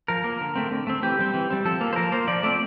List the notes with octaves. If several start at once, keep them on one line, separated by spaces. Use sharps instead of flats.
F3 A#4
A#3
D3
A3 C4
D3
A3 C4
E3 G4
G3 C4
E3
G3 C4
F3 A4
A#3
C5
F3 A#4
A#3 C5
F3 D5
A3 C4 D5